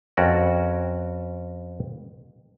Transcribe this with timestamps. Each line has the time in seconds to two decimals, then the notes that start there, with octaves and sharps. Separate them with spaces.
0.17 F2 C#4 F#4 A#4 D5